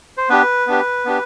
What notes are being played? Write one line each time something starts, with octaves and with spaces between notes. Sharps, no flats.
C5
B3 D4 G4 B4
B3 D4 G4
B3 D4 G4